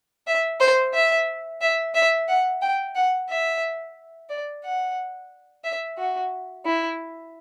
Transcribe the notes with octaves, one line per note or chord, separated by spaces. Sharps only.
E5
C5
E5
E5
E5
F#5
G5
F#5
E5
D5
F#5
E5
F#4
E4